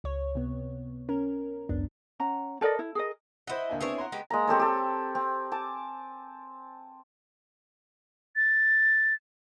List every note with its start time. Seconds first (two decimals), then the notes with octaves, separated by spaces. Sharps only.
0.04 C#2 C#5
0.35 C3 B3
1.09 C#4 A#4
1.69 G#1 C#2 F#2 B3 D4
2.20 C#4 F#5 A#5
2.61 A4 A#4 D5 D#5
2.79 E4
2.95 G#4 A#4 D#5
3.47 E4 C5 D#5 F#5
3.69 D2 A#3 G#5
3.81 B3 C4 D4 E4 G#4 C#5
3.98 F#5 A#5 C6
4.12 G#3 B3 G4
4.30 G#3 A#3 A#5
4.47 C4 G4 A4 C#5
4.59 G4 A4
5.15 C4
5.52 G#5 A5 D6
8.36 A6